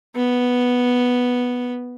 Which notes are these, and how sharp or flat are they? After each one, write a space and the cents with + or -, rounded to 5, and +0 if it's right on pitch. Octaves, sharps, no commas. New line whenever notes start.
B3 -5